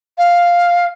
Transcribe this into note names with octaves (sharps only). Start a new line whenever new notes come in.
F5